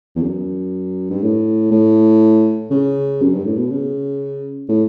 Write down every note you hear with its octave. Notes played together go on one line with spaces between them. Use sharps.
E2
F#2
G2
A2
A2
C#3
F#2
G2
A2
B2
C#3
A2